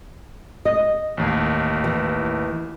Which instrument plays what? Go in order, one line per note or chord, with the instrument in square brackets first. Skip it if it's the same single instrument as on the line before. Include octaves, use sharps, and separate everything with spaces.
[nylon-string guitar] D#5
[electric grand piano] A1 D#2
[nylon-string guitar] E3